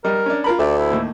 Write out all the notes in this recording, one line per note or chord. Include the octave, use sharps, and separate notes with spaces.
G3 A#4 D#5
C#4 D4
F4 A#4 B5
D2 D5 E5
E4
D#2 A2